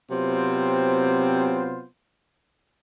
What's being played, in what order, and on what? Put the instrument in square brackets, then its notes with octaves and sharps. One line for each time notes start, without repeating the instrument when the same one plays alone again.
[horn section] C3 F#3 B3 C4 F4 C5